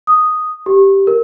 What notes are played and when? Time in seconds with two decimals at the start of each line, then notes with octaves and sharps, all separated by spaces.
0.07 D#6
0.66 G4
1.07 A#4